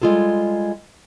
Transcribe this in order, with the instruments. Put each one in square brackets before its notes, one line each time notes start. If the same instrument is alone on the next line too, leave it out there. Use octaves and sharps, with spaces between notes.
[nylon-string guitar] G3 G#3 A#3 F4 G#4 A4